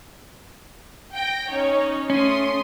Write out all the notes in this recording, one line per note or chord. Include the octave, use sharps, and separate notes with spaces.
G5 A#6
C#4 D#4 C#5
A3 C#4 C6 D#6